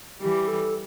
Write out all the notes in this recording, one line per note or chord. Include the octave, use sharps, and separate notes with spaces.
E3 G3 G4
A4